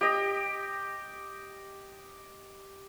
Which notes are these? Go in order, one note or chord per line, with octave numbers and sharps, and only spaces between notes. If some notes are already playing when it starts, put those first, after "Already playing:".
G4 D#5